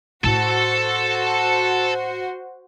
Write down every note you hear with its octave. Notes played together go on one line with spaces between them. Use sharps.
A2 E4 F#4 A4 C5 A5